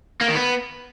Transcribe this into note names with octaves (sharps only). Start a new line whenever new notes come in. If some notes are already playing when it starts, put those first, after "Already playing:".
A#3
D#3
B3